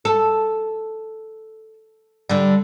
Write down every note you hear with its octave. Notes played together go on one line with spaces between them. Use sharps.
A4
D3 G3